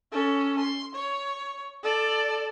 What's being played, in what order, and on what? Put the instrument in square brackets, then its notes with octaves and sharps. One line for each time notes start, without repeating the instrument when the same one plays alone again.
[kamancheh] C#4 A4
C6
C#5
A4 D5